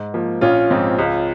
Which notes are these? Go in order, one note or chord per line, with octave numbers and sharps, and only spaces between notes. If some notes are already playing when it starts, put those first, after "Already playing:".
Already playing: G#2
F3 A#3
A#1 C#4 F4
G#2 F3 C4
C#2